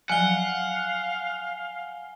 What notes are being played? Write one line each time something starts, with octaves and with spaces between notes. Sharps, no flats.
F3 F#3 F5 F#5 G#5 G7